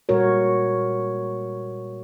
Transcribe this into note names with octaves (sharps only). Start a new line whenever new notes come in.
A#2 G3 G#3 F#4 A#4 C#5